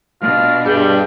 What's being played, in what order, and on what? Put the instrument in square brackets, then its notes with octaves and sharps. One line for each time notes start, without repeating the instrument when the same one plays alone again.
[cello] B2 D4 [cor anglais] F4
[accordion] G2 [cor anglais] G3 [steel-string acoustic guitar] G#4